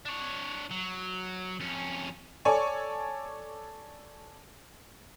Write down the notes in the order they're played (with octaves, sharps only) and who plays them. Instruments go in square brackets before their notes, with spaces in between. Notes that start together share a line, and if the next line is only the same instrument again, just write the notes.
[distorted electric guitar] D4 C#5
F#3
F2 C#4
[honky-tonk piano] A4 C#5 D5 G#5 C#6